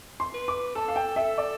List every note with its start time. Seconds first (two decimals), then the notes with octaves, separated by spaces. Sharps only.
0.20 C6
0.34 B4
0.48 D6
0.75 A4 A5
0.88 F5
0.96 G5
1.16 A4 E5
1.38 D5